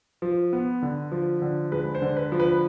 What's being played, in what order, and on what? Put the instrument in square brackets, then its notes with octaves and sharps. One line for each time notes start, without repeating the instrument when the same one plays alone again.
[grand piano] F3
B3
D3
F3
D3
G#3 B4
C5
D3
B4
F3
B4